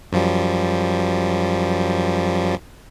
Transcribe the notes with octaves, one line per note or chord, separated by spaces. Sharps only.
F#2 F3 G3